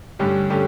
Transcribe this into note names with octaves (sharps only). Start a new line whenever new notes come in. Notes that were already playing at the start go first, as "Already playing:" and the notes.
G2 D3 A3 C#4 G4
D3 A3 C#4 G4